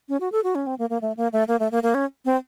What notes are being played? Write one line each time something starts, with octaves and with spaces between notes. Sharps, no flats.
C#4
F#4
A4
F#4
C#4
C4
A#3
A#3
A3
A#3
A3
A#3
A3
A#3
A#3
C#4
C4